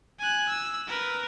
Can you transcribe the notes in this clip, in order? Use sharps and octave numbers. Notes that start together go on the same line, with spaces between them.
G#5 F#6
E6
A#4 B4